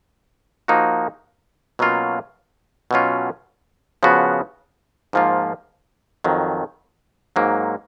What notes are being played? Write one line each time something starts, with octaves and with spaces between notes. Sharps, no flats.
F3 A#3 D#4 F#4
B2 F#3 A#3 C#4 F4
B2 F#3 C#4 F4
C#3 F3 B3 F#4
G#2 F3 A#3 F4
F2 D#3 F#3
G#2 F#3 A#3